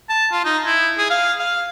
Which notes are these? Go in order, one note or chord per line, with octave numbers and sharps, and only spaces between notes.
A5
F4
D#4
E4
G#4
F5
F5